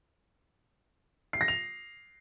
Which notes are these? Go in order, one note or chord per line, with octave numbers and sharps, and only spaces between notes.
C7
A#6
F7